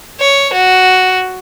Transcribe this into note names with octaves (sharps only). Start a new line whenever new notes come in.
C#5
F#4